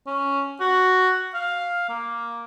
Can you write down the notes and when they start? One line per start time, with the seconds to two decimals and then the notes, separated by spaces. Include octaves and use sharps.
0.07 C#4
0.61 F#4
1.34 F5
1.89 A#3